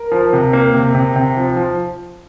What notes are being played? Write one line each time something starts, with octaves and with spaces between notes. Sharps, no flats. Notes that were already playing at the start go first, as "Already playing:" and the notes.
Already playing: A#4
F3
C3
A#3
C3
C3
C3
F3
F3